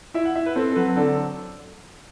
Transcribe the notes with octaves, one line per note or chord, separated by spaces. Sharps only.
E4 E5
F#5
E4 E5
B4
C4 A4
A4
F#3 B4
D3 A4